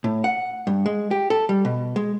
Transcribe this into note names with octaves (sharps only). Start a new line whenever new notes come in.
A2
F#5
G2
G#3
G4
A4
G3
B2
G#3